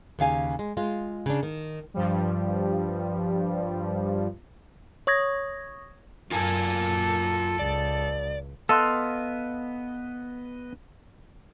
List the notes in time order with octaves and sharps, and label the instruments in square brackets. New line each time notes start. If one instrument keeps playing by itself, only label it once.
[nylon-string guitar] D#2 C#3 F5 G#5
G#3
G#3 F4
C#3 D4
D#3
[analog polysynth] G2 F3 G3
[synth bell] C#5 C#6 D#6 G#6 A#6
[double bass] F#2 [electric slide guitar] F4 A#4 G#5 [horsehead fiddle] A4
[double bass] C#2 [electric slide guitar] D5
[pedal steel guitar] B3 D#5 [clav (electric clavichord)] A4 [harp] F5 C6 F#6